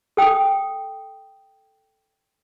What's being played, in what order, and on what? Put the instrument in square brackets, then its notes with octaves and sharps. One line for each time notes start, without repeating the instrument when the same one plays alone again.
[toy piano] A4 G5 D#6